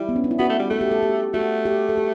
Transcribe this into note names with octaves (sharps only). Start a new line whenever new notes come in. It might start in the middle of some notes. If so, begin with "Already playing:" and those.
Already playing: G3 E4
B3
C#4
D4
E4
B3 F#4
A3
G3
A3 A4
G4
A4
G4
A3 F#4
G4
A4
G4